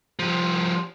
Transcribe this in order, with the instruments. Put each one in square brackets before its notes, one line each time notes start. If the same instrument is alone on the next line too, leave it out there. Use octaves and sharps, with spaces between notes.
[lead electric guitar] F3 G3